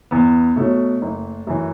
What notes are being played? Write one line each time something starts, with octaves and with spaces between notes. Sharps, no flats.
E2 B3
B2 F#3 A3
F#1
F#2 E3